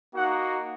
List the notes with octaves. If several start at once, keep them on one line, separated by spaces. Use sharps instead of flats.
A#3 D#4 F#4 F#5